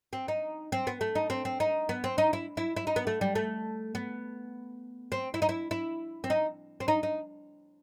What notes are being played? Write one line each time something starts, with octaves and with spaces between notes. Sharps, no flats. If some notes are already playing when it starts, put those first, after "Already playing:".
C4
D#4
C4
B3
A3
D#4
C4
C4
D#4
B3
C4
D#4
E4
E4
E4
D#4
B3
A3
G3
A3
B3
C4
E4
D#4
E4
E4
C4
D#4
C4
D#4
D#4